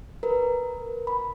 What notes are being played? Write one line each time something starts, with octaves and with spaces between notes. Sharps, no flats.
A#4 B4
B5